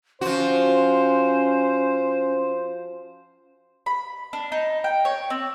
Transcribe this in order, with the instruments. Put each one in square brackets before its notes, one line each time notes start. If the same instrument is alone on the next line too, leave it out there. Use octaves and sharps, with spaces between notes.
[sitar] F3 F#4 [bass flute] C#4 [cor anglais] C5
[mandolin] B5
D4
D#4
G5
C#5
C4